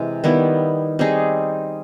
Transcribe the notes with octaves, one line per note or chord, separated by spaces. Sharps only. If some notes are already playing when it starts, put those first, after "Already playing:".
Already playing: C3 E3 G#3
D#3 G3 B3 E4
G3 C4 D#4 G#4